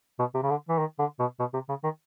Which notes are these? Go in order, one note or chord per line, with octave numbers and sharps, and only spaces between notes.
B2
C3
C#3
D3
E3
D#3
D3
B2
B2
C3
C#3
D#3